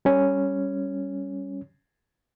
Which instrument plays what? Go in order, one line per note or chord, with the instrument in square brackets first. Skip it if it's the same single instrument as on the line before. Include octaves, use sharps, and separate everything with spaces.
[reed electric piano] G3 C#4